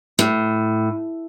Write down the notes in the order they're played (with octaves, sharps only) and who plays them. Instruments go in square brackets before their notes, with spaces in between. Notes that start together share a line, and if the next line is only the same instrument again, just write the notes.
[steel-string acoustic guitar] A2